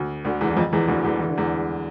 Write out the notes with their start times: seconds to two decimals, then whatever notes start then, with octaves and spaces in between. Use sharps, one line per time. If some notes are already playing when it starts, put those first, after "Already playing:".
Already playing: D2
0.25 D2 D3
0.41 E2 E3
0.51 E3
0.57 F2 F3
0.73 E2 E3
0.88 D2 D3
1.04 E2 E3
1.20 E3
1.29 D3
1.38 E2 E3